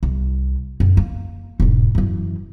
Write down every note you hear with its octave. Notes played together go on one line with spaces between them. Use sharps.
C2
F#2
A#3
E1 G#2
F#2 E3